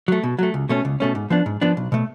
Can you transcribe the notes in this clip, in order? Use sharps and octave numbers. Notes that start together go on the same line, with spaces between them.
F#3 A3
B2
F#3 A3
C#2
B2 A3 C#4
C#2
B2 A3 C#4
G#2
F3 B3 D4
G#2
F3 B3 D4
B1
B2 A3